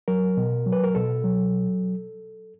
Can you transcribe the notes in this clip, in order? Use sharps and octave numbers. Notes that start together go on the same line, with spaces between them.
F#3 A#4
B2
F#3
B4
A#4
B2 A4
F#3